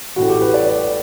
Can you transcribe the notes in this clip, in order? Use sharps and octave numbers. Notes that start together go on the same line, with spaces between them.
A1 A2 E3 F#4
G4
B4
D5